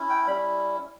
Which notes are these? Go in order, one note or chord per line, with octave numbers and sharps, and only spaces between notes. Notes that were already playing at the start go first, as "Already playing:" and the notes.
Already playing: C#4 E4
G5
G3 C#4 E4 B5